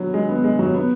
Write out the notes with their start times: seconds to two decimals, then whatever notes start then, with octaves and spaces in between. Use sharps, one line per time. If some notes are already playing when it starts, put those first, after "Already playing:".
Already playing: F#3 B3
0.14 G#3
0.29 B3
0.44 G#3
0.59 F#3
0.74 B3